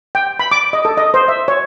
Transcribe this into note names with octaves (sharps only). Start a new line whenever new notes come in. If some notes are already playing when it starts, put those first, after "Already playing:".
G5
B5
D6
D#5
A4
D#5
C5
E5
C#5